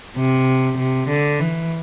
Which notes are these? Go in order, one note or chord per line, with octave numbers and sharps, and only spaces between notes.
C3
C3
D3
E3